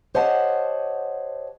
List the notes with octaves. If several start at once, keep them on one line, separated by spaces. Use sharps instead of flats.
G4 C5 C#5 D#5 F#5 A5